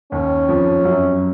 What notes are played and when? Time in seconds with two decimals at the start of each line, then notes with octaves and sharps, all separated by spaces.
0.12 D#2 D#3 C#4
0.49 F2 F3
0.85 F#2 F#3